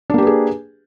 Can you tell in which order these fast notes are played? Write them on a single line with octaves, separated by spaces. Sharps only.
D4 A#3 G4 B4 G#4